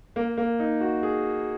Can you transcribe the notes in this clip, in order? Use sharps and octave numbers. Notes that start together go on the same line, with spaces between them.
A#3
A#3
D#4
F#4
G#4